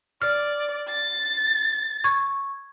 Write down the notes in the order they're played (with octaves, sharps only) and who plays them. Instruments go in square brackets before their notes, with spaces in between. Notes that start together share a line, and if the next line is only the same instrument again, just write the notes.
[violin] D5 [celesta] F6
[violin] A6
[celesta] C#6 G#6